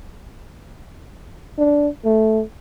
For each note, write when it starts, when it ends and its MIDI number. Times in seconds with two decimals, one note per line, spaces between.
1.58 1.88 62
2.05 2.41 57